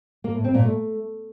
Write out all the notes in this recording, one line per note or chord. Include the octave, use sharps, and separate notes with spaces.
A#3
A2
C4
A#2
A3